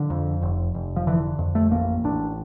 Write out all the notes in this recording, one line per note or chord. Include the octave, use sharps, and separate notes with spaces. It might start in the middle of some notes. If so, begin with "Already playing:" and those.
Already playing: D3 F3
F2
F1
F1
F3
D3 E3
F2
A3
A1 A#3
A1 D4